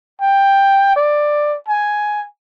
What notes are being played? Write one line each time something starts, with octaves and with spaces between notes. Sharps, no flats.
G5
D5
G#5